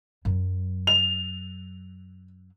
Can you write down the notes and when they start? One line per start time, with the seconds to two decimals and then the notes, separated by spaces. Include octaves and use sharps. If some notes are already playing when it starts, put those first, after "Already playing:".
0.25 F#2 F#3
0.87 F7